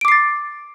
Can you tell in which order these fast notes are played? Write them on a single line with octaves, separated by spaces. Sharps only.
D7 D6 C7 A6